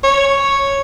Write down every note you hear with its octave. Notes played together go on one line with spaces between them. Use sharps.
C#5